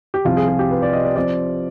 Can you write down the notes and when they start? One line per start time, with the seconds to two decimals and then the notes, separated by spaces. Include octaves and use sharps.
0.14 G4
0.25 C2 C3 F3 F4
0.37 G#4
0.48 G#4
0.59 G4
0.71 B4
0.82 D5
0.93 D#5
1.05 D5
1.16 F3 C4 D5